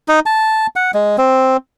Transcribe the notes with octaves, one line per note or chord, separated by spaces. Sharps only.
D#4
A5
F#5
G#3
C4